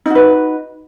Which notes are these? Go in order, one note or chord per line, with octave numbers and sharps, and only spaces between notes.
D#4 F#4 B4